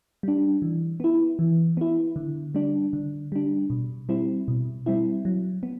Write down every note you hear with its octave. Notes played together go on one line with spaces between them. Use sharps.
G3 D4
E3
B3 E4
E3
B3 E4
D3
G3 D4
D3
G3 D4
B2
G3 C4 E4
B2
G3 C4 E4
F#3
B3